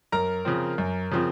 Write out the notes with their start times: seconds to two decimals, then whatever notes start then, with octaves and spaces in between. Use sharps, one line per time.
0.12 F#2 A#4 A#5
0.45 C#3 F3 C4
0.78 F#2
1.11 C#3 F3 C4